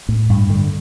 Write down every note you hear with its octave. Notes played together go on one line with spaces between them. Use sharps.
A2
G2
D3